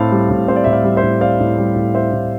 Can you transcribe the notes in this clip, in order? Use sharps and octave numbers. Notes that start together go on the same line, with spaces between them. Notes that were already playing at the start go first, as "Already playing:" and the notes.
Already playing: A2 C4 F5 A5
G3
A2
C4 C5
D5
A2 E5
D5 F5
G3
C5 E5
A2
C4 D5 F5
A2
G3
A2
C4 C5 E5
A2